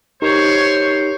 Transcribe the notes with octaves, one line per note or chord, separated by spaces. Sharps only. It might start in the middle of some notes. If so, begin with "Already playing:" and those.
D#4 G4 A#4 C5 C#5